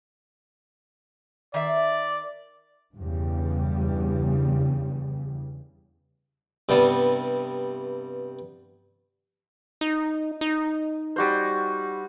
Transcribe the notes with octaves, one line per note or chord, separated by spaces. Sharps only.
D#3 D5 E5
E2 G2 C#3 G3
G2 C3 G3 B3 A5
D#4
D#4
G3 F#4 C5